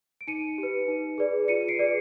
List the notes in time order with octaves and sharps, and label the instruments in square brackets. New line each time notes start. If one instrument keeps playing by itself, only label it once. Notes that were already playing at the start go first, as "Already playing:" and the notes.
[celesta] D7
D#4 C#7 D#7
G4
B4
D#4
G#4 B4 D5
F4 C#7 D#7
C7 D7
G#4 B4 D5